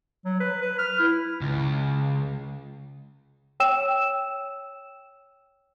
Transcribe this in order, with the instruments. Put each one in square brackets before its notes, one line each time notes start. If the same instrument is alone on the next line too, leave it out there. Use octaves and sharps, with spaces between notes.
[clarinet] F#3
B4
B4
F6
E4
[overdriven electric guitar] C#2
[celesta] C#5 G5 E6 E7